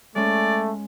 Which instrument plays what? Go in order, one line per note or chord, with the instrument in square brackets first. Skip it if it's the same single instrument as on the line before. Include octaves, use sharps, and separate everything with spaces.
[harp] G#3 C#4 [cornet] A3 [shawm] D5